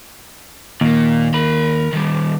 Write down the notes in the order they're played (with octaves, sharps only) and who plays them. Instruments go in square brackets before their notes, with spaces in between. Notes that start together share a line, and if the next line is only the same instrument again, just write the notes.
[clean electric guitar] D#2 [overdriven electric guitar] A#2 A#3
[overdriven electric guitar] A#4 B5
D#3 G3